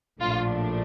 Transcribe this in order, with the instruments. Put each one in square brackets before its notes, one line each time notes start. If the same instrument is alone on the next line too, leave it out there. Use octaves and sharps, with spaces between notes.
[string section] A#1 A2 F3 A3 D4 F4